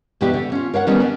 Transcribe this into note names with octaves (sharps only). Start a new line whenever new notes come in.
E2 B2 D4 G4 E5
D3
C#4 F4
A#4 C#5 F5 F#5
D#3 G3 B3 C#4 D4 D#5
D4